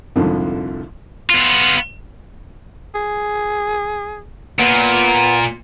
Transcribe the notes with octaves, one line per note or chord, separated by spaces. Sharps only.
C2 F2 G#2 D3 F3
B3 F4
G#4
A#2 B3